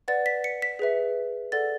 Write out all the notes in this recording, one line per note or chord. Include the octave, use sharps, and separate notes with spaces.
B4 D5 F#5 A6
B6
C#7
B6
G#4 B4 E5
A4 D5 F#5 A6